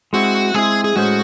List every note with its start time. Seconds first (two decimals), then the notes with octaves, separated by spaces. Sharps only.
0.13 G#3 C4 E4 F#4
0.54 G#3 C4 E4 G#4
0.84 G#4
0.96 A2 G#3 C#4 F#4 G#4 C5